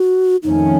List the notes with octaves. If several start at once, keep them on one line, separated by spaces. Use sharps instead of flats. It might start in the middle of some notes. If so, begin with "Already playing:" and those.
Already playing: F#4
F2 D#3 A3 C#4 D#4